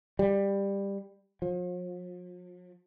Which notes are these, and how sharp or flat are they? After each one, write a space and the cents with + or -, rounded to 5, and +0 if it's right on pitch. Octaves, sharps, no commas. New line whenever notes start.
G3 +15
F3 +45